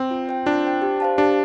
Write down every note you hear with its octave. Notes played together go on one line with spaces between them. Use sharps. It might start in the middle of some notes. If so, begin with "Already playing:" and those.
Already playing: C4
F4
C5 G5
D4 F4
C5 G5
G4
C5 F5 A5
D4 G4